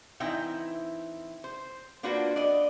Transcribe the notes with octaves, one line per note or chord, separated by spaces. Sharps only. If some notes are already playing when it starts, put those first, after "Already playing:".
E3 C4 D#4 E4 E5 G5
C5
A#3 D4 F4 F#4 B4 C5
D5 D#5